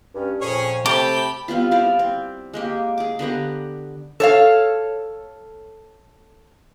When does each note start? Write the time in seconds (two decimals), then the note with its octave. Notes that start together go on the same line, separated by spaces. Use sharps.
0.15 G2 C#4
0.42 F2 A#2 C#4 G#4 C#5
0.86 C3 A3 C4 G4 A5 B5 D6
1.48 G3 B3 C4 F4
1.71 E4 C5 D5 F5
1.99 C4
2.53 G#3 A#3 G4
2.98 G#4 D6
3.19 D3 B3 G4 A#5
4.20 A4 C#5 F5